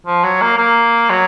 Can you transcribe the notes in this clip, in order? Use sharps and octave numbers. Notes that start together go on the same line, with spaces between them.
F3
F#3
A#3
A#3
F#3